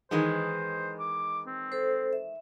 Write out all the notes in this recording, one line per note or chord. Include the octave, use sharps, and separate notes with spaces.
D#3 E3 G#3 C5
D6
C4
A4 C5
E5